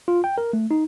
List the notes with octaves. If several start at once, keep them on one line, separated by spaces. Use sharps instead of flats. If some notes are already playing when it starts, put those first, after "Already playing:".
F4
G5
A#4
A3
D#4